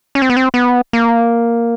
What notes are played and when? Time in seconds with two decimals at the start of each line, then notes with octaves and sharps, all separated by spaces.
0.15 C#4
0.22 C4
0.30 B3
0.37 C4
0.54 B3
0.93 A#3